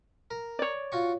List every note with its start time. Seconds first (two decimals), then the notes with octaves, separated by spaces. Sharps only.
0.31 A#4
0.59 C#5 D5
0.92 F4 F#4 C#6